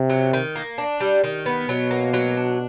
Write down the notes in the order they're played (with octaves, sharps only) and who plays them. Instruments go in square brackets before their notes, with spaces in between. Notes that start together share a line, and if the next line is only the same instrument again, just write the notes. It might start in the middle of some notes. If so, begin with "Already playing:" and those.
Already playing: [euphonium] C3
[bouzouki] F#3
D#3
A#3
D4
G3
D#3
B3
[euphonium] B2 [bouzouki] F#3
[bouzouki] A#3
F#3
D4